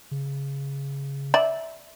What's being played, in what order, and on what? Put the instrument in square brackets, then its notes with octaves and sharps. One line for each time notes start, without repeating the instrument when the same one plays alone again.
[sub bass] C#3
[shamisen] D5 E5